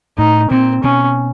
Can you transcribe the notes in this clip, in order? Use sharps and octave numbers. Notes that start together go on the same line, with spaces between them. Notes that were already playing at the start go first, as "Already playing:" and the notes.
A2 D#4
A#2 C4
B2 C#4